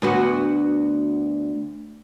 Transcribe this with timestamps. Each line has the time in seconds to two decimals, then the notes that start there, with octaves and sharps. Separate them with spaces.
0.02 D2 B3 F#4